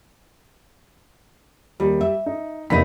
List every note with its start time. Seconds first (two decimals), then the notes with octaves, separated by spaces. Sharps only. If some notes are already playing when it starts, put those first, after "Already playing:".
1.80 D#2 G3
2.01 E5
2.26 D#4
2.70 E2 C3 A#3 D#4 B5 B6